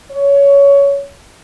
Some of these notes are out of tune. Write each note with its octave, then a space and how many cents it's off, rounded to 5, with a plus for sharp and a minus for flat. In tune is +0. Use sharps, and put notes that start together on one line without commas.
C#5 +20